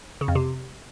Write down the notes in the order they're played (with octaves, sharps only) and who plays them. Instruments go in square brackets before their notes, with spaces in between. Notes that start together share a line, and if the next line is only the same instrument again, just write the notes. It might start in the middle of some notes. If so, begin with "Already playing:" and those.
[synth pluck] C#3
F2
C3